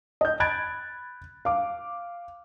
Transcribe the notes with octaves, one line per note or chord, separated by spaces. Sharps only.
D#5 G6
B5 F#6 G#6 A6 D7
F5 D6